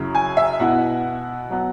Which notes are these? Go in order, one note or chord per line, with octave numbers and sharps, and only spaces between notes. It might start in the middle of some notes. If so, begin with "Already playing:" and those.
Already playing: F#2 C#3 F#3 E4
G#5
E5
B2 B3 E4 F#5
F#3 B3